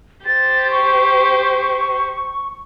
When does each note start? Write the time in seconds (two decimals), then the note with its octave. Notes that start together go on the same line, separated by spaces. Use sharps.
0.26 G4 C5 A6
0.71 C#6